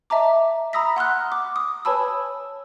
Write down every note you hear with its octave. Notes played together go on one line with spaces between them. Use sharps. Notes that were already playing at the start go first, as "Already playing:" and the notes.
D#5 E5 A5 A#5 D6
A#5 B5 D#6 E6 A#6 B6
F#5 C6 F6 F#6
D6
D#6
B4 C#5 G#5 A5 B5 E6